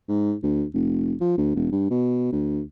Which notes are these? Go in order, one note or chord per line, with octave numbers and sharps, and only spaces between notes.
G#2
D2
F1
F3
D2
E1
G2
B2
D2